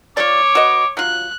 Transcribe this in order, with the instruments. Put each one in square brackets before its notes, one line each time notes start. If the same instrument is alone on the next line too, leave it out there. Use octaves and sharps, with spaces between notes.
[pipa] F4 D5 [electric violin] C#5 [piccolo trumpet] D6
[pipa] F#4 B4 D#5
[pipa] F#3 F4 [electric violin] F#6